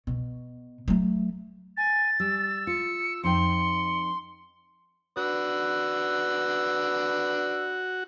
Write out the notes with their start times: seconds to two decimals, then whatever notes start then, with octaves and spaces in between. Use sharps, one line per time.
0.07 B2
0.88 F#3 A3
1.77 G#5 A6
2.20 G3 E6
2.67 F4 C#7
3.23 F2 D#4 G5 C6 C#7
5.17 D4 F#4 B4 E6